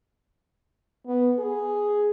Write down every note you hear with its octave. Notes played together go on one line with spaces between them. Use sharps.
B3
G#4